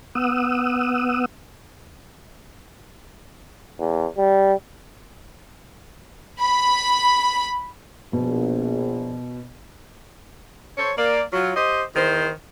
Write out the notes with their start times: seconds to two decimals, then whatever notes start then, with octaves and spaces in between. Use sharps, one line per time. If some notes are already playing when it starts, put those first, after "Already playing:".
0.15 B3 F#5 D#6 E6
3.80 E2
4.17 G3
6.40 B5
8.13 A#1 B2
10.78 A4 C5 C#5
10.96 A#3 D5
11.32 F#3 F4
11.55 G4 C5 D#5
11.95 E2 D#3 C5